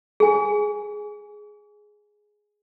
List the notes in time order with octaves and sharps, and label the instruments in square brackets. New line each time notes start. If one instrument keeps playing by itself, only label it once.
[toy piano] G#4 G#5